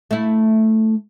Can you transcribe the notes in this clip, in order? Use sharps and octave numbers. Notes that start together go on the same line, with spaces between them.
A3 E4